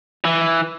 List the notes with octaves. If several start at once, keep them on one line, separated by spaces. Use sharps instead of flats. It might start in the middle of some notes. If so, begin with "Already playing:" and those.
E3